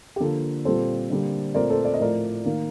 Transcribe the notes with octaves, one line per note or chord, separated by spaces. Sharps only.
G4
D3 F3 A#3 A4
A#2 G3 C4 A4 C5
D3 G3 A#3
A#2 A3 C4 A#4 D5
A4 C5
D5
D#5
A2 F3 A3 A#4 D5
D#3 A#3